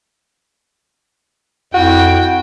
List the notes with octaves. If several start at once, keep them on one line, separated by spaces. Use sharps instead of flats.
F2 E4 F#4 G5